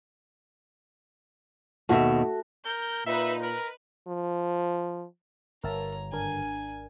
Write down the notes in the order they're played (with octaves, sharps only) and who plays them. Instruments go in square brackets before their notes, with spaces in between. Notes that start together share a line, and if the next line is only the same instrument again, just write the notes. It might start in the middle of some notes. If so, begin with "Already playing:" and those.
[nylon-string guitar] D#2 B2 E5 [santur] A3 F#4
[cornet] A#4 [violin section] G6
[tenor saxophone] A#2 [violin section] D#4 B4 [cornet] E5
[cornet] A#4 [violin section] B4
[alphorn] F3
[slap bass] G1 [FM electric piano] A#4 E5 A5 [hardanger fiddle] C#5 A#5
[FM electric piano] G#1 D4 A#4 [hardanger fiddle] G#5